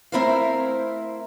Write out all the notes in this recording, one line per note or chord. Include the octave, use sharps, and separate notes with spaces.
A3 C4 E4 A#4 C5 F5